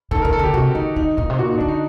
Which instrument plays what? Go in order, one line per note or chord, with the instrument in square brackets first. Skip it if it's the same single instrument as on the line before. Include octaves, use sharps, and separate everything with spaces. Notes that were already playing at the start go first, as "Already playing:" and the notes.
[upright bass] D#3 [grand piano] A4
[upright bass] D#3 [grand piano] A#4
[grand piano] A4
[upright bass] D3 [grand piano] G4
[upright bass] C3 [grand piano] F#4
[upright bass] D#3 [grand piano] D#4
[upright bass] D3 [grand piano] D#4
[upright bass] A#2 [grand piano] D#4
[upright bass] C3
[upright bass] A#2 [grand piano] F#4
[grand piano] D#4
[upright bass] D3 [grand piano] D4
[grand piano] D#4